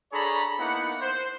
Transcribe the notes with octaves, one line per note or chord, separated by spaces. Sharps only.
D4 G#4 A4 C#5 A#5 B5
A#3 B3 D#4 E4 F#5
C5